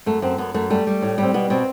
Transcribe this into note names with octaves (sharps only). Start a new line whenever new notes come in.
F#2 A3
F#2 C4
F#2 B3
F#2 A3
G3 A3
G3
A2
G3
C4
B2 B3
B2 C4